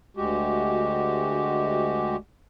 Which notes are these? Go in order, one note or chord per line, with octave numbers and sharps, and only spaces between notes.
D2 G#3 F#4 G4